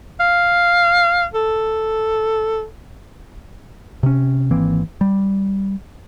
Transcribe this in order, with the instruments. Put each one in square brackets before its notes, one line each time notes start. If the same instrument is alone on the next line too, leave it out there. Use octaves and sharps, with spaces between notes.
[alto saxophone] F5
A4
[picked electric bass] C3 C#4
G#1 E3 A#3 C4
G3